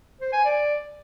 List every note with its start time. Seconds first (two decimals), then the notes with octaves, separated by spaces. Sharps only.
0.21 C5
0.33 G#5
0.45 D5